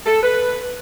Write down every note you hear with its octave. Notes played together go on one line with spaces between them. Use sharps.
A4
B4